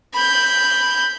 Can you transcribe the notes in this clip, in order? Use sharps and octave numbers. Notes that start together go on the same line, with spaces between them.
B5 G6